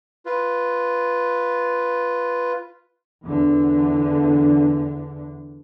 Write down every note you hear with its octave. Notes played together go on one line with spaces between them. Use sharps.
F4 B4
E2 D3